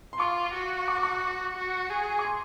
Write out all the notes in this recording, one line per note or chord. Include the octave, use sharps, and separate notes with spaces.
C6
F4 C#6
F#4
C#6
D6
C#6
F#4
G#4
C#6
C6